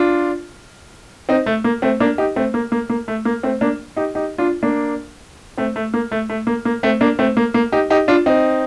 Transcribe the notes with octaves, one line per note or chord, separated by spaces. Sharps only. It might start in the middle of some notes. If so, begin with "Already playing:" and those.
Already playing: D4 F4
C4 D#4
A3
A#3
A3 C4
A#3 D4
D#4 G4
A3 C4
A#3
A#3
A#3
A3
A#3
A3 C4
A#3 D4
D#4 G4
D#4 G4
D4 F4
A#3 D4
A3 C4
A3
A#3
A3
A3
A#3
A#3
A3 C4
A#3 D4
A3 C4
A#3
A#3
D#4 G4
D#4 G4
D4 F4
C4 D#4